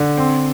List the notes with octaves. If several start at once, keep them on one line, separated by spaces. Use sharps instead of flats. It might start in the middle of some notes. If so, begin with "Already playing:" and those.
Already playing: D3
C4